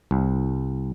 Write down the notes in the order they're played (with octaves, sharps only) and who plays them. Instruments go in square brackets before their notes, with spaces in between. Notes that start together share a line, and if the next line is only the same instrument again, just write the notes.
[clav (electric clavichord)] C2